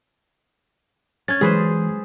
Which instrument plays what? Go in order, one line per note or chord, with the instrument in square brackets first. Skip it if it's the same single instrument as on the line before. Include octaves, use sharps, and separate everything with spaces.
[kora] C#4 [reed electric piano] G#6 A6
[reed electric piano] E3 F#3 G#3 [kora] G#4 B4 C5